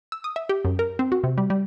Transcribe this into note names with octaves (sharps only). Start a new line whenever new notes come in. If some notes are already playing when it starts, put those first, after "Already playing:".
E6
D#6
E5
G4
F#2
A#4
C4
F#4
C3
G3
G3